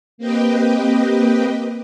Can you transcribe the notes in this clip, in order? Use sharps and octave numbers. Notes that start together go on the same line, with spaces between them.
A#3 C4 G4 B4 D#5 G5